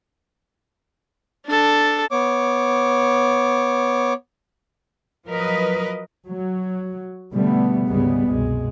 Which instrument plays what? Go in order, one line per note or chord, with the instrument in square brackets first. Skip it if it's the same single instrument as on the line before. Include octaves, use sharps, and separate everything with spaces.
[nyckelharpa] D4 A4
[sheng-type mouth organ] B3 C#5 D6
[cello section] F3 F#3 A#4 B4 D#5
[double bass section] F#3
B2 D3 G3 A3 B3
G#1 D2 C#3 G3 G#3 B3
C2 F#2 B2 G#3